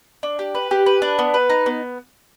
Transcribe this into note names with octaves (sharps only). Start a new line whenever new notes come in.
D4
G4
B4
G4
B4
D4
B3
B4
D#4
B3